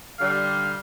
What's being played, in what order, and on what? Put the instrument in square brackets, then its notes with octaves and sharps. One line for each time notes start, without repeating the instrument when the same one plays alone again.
[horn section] D3 G3 [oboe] F5